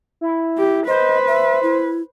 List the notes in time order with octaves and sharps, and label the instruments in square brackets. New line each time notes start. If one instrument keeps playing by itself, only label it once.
[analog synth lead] E4
[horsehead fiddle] G4
[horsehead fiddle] B4 [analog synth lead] C5 [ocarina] D#5
[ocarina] E5
E4